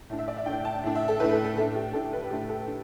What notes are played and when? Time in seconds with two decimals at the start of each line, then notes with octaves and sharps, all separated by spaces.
0.10 A2 A3 D4
0.19 E5
0.28 D5
0.37 E5
0.46 A2 A3 D4 G5
0.65 A5
0.84 A2 A3 D4
0.95 E5
1.08 A4
1.20 A2 A3 D4 B4
1.32 A4
1.45 A4
1.56 A2 A3 D4 A4
1.75 G4
1.93 A2 A3 D4 A4
2.13 B4
2.30 A2 A3 D4 G4
2.49 A4
2.68 D4